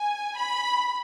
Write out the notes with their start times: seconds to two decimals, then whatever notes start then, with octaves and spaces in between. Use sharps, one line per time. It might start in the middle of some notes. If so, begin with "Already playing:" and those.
Already playing: G#5
0.38 B5